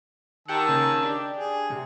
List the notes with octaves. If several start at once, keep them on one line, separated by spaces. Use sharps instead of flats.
D#3 G4 F#5 A5 E6
C#3 A#3 G#4
D4 G4
G#4
A2 C3